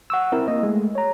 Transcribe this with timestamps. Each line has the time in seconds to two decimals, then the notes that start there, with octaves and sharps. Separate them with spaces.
0.10 F#5 C#6 E6
0.32 C4 E4 A#4
0.48 A#3 D#5
0.63 G#3 A3
0.95 C#5 A#5